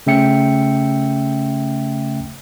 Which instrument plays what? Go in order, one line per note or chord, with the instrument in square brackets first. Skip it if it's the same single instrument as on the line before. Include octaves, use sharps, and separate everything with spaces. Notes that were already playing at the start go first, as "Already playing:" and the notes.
[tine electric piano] C#3 A3 C#4 E5 G5 C#7